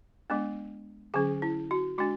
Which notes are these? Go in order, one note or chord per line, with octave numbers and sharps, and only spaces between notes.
G#3 B3 D4
D3 F#3 C#4 G#4
E4
F#4
G#3 D4 F#4